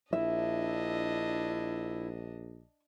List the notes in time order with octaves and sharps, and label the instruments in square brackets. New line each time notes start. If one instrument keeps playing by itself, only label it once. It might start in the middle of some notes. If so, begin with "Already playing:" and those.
[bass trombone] A#1 [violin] D4 D#5 [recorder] E4 [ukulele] E5